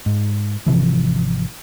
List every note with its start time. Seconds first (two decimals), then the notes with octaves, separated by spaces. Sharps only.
0.06 G#2
0.66 G#1 C3 E3 F3